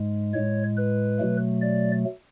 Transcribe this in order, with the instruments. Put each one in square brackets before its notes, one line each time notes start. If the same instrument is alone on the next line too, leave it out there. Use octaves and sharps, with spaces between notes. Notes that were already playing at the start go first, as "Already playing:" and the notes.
Already playing: [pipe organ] G#2 G#3
A2 G#3 C#5
B4
B2 F#3 A3
D5